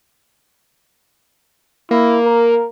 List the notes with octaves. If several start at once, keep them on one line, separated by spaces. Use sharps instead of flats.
A#3 E4
A#4